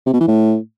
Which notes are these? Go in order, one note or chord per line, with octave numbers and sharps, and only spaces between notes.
C3
B2
E3
A2